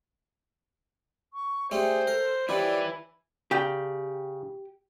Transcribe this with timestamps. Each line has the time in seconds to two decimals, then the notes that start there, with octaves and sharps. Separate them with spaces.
1.34 C#6
1.71 G3 A3 C#4 G#4 C5
2.07 A4 A#4
2.49 F3 G3 E4 B4 C#5 D5
3.51 C#3 G4 D5 G5 A#5